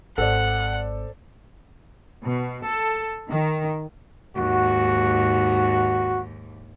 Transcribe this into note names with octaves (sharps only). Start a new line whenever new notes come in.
G#1 A4 C5 D5 F#5
B2
A4
D#3
D#2 G#2 F#4